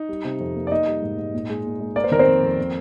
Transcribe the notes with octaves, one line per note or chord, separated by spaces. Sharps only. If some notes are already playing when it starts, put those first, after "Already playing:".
Already playing: D#4
G3
C3
F2
A#3
D5
A#3 D#4 D#5
G3
G#2
G#2
A#2
G#3
A#2
G#3
A#3 D5
C5
D#3 A#4
C4 C5
F2
F2
A#3